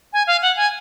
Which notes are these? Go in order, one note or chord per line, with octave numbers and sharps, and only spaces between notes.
G#5
F5
F#5
G#5